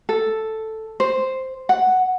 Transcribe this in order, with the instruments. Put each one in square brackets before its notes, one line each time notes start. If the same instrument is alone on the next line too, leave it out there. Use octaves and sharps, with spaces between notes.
[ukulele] A4
C5
F#5